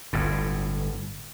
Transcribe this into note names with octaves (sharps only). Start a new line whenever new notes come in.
G1 A2